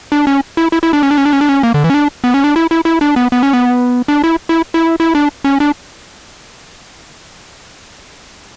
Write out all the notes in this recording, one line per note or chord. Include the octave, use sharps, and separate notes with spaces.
D4
C#4
E4
E4
E4
D4
C#4
D4
C#4
D4
C#4
D4
C#4
A#3
D3
E3
C#4
D4
B3
C#4
D4
E4
E4
E4
D4
B3
B3
C#4
B3
D4
E4
E4
E4
E4
D4
C#4
D4